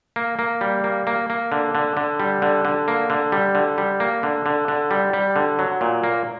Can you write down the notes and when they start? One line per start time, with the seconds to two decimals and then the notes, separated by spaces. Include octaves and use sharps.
0.16 A#3
0.39 A#3
0.61 G3
0.84 A#3
1.07 A#3
1.30 A#3
1.52 D3
1.75 D3
1.97 D3
2.20 G3
2.42 D3
2.65 D3
2.88 A#3
3.10 D3
3.32 G3
3.55 D3
3.78 G3
4.00 A#3
4.23 D3
4.46 D3
4.68 D3
4.91 G3
5.13 G3
5.36 D3
5.59 F#3
5.81 A#2
6.04 A#3